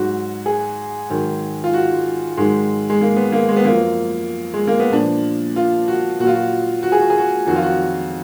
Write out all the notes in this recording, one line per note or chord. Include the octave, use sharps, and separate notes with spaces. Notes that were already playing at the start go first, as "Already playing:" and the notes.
Already playing: G#2 F#3 F#4
G#4
G#2 D#3 F#3
F4
F#4
G#2 D#3 F#3 G#3
G#3
A#3
B3
A#3
G#3
B3
F#2 F3 A#3
G#3
A#3
B3
A#2 F3 D4
F4
F#4
A#2 F#3 F4 F#4
F#4
F#4
G#4
F#4
G#4
F#4
F2 D#3 F#3 F#4
F4
F#4